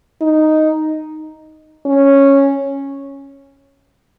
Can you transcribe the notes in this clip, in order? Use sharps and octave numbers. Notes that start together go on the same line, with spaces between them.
D#4
C#4